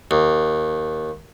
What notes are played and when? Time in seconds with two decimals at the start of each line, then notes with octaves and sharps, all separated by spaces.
0.11 D#2